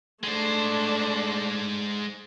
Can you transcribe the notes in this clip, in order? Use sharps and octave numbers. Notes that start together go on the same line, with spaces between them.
G#3 A3 D4 C5